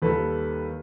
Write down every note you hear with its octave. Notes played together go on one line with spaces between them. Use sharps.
D#2 D#3 G3 A4 B4